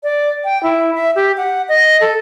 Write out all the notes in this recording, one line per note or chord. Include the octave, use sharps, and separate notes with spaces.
D5
G5
E4
E5
G4
F#5
D#5
A4